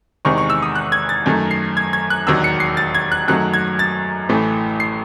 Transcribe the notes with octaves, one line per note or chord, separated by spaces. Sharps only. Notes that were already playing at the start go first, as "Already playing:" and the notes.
E2 C3 D#3 G#3 C#6
C#6
E6
D#6
F#6
G#6
A6
F#2 D#3 A3
C7
G#6
G#6
F#6
E1 D#2 D#3 F#3 E6
C#7
C7
A6
G#6
F#6
F#2 D#3 F#3 A3 F#6
G#6
A6
A1 A2 E3 A3
C7